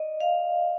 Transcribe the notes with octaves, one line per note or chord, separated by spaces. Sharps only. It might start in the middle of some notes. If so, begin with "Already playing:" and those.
Already playing: D5 D#5
F5